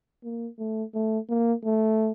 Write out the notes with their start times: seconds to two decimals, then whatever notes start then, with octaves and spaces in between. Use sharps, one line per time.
0.24 A#3
0.59 A3
0.94 A3
1.29 A#3
1.64 A3